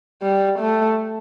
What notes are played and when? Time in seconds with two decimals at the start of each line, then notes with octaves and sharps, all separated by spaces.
0.22 G3
0.59 A3